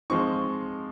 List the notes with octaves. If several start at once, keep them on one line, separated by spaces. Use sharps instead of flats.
F3 G#3 C4 D#4 C#6